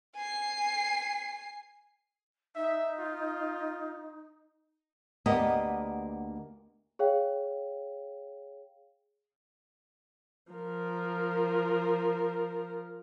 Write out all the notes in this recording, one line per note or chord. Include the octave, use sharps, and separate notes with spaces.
G#5 C7
D#4 E5
F4
D2 A#3 B3 G4 D#5
G#4 C#5 F5 G5
F3 A#4